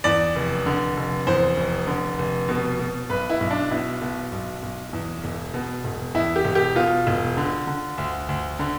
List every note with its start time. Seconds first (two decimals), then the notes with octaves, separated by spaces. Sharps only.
0.04 E2 D5
0.36 F1
0.66 D3
0.97 F1
1.27 E2 C5
1.57 F1
1.87 D3
2.18 F1
2.49 B2
2.79 B2
3.10 B1 B4
3.29 E4
3.41 B1
3.51 D4
3.71 B2 E4
4.02 B2
4.32 B1
4.63 B1
4.93 E2
5.24 E1
5.54 B2
5.84 E1
6.14 E2 E4
6.36 G4
6.45 E1
6.55 G4
6.75 B2 F4
7.07 E1
7.37 D3
7.67 D3
7.98 D2
8.29 D2
8.59 D3